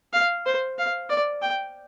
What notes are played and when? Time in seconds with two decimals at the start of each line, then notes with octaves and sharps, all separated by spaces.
0.13 F5
0.46 C5
0.78 F5
1.10 D5
1.42 G5